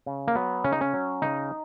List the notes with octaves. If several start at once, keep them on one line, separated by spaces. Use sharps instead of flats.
C#3
A#3
F#3 B3
C#3 C#4
D#4
C#4
F#3
C#3 D#4